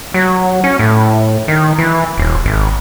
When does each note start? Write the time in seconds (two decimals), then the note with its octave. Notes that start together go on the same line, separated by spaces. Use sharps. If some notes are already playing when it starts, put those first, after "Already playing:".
0.14 F#3
0.64 C#4
0.79 A2
1.48 D#3
1.78 E3
2.18 D#1
2.46 G#1